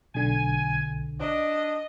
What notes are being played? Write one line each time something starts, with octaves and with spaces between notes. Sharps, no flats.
B1 D3 G#5
D4 D#5